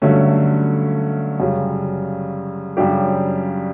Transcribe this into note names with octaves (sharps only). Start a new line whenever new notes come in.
G2 D3 F#3 A3 C#4
F#2 C#3 G3
F#2 C#3 G3 D4 G4